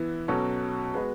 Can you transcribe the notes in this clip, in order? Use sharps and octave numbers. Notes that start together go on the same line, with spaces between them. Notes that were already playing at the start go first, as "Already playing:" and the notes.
Already playing: E3 B3 E4
B2 F#3 C#4 F#4 A4
G#3 B3 F#4 B4